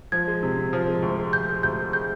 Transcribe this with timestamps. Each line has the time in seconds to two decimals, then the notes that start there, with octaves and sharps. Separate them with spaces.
0.12 F3 G#6
0.27 G#3
0.43 C3
0.57 C3
0.73 F3
0.88 G#3
1.02 D2
1.18 G#3
1.33 D2 G6
1.49 G#3
1.63 D2 G6
1.79 G#3
1.93 G#3 G6